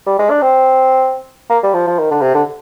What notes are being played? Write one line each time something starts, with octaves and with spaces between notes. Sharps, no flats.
G3
G#3
D4
C4
A#3
G3
F3
F3
D#3
D3
C3
D3